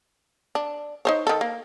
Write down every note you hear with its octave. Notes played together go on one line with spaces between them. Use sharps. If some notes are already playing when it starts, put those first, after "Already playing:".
D4
D#4 C5 C#5
D#3 A4
A#3